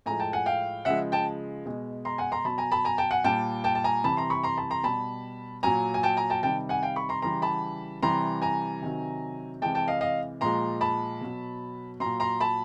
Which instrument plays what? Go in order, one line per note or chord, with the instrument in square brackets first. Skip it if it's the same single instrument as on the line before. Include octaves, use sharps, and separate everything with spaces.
[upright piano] A2 F3 G#3 G#5 A#5
G5 A5
F#5 G#5
F5 G5
C#3 F3 G#3 E5 F#5
G5 A5
B2 G#3
A#5 C6
F#5 G#5
A#5 C6
B2 F#3 A5 B5
G#5 A#5
A5 B5
G#5 A#5
G5 A5
F#5 G#5
A#2 G3 G5 A5
G5 A5
A5
G#5 A#5
C3 E3 G3 A5 B5
A#5 C6
B5 C#6
A#5 C6
A5 B5
A#5 C6
B2 G3 A5 B5
A#2 F#3 G#5 A#5
G#5
G5 A5
G#5 A#5
G5 A5
C3 D#3 G3 G5 A5
F#5 G#5
F5 G5
B5 C#6
A#5 C6
C#3 E3 G3 A#5 C6
A5 B5
C3 E3 G3 A#5 C6
G#5 A#5
C3 D#3 F#3
C3 E3 G#3 G5 A5
G5 A5
D#5 F5
D#5 F5
A#2 F3 G#3 A#5 C6
A5 B5
B2 F#3
A#2 F#3 A#5 C6
A#5 C6
A5 B5